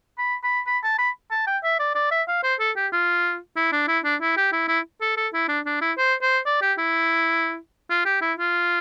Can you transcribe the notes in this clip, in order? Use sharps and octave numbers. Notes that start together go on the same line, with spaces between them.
B5
B5
B5
A5
B5
A5
G5
E5
D5
D5
E5
F5
C5
A4
G4
F4
E4
D4
E4
D4
E4
G4
E4
E4
A4
A4
E4
D4
D4
E4
C5
C5
D5
G4
E4
F4
G4
E4
F4